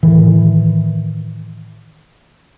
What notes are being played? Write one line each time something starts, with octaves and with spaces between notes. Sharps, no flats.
A2 D#3 E3